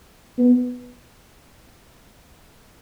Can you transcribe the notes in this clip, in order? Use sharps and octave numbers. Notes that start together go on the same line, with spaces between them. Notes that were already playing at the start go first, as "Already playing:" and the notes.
B3